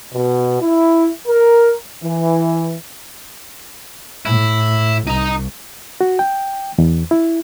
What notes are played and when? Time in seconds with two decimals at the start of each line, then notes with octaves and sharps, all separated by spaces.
0.14 B2
0.61 E4
1.28 A#4
2.03 E3
4.26 A2 E4
5.07 C2 D#4 A#5
6.01 F#4
6.19 G5
6.78 E2
7.11 E4